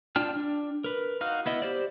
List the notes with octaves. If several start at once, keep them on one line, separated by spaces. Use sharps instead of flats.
D4 F4 G5 A5 F6
D4
A#4 B4
D#4 F#4 F5 F6
B3 E4 D#5
G4 C5 D5